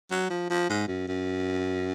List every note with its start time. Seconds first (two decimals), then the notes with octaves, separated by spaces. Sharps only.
0.11 F#3
0.30 F3
0.50 F3
0.69 G#2
0.87 F#2
1.08 F#2